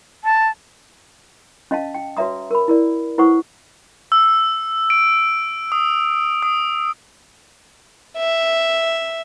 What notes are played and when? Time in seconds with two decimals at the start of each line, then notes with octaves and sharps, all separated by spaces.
0.24 A5
1.71 C#4 D#5 F5 A5
1.95 G5
2.17 F#4 B4 C#5 E5 A#5 D#6
2.51 A#4 B5
2.68 E4 A#4 D5
3.18 E4 B4 C5 F#5 C#6 D#6
4.12 E6
4.90 D7
5.72 D#6
6.43 D#6
8.18 E5